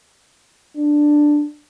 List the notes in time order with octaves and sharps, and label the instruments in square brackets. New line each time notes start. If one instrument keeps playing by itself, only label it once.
[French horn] D4